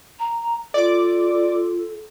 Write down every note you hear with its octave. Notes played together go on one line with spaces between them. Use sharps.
A#5
F4 A4 D5 D6